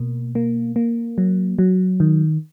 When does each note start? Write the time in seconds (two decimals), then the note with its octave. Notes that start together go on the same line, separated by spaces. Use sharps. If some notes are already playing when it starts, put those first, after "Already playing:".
Already playing: B2 A#3
0.35 A#3
0.76 A#3
1.18 F#3
1.59 F#3
2.00 D#3